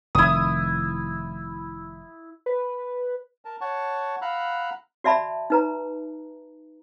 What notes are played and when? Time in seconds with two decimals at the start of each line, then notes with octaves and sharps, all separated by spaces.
0.15 F1 D#3 E4 D#6
2.46 B4
3.45 A#4 A5
3.61 C#5 F#5 A5 C#6
4.22 F5 F#5 A#5 B5 E6 F#6
5.04 F#4 D5 E5 A5 B5
5.50 D#4 B4 A#5